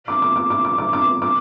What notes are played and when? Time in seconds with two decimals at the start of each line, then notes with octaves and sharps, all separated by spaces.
0.08 D6
0.22 D6
0.36 D6
0.50 D6
0.65 D6
0.78 D6
0.93 D6
1.22 D6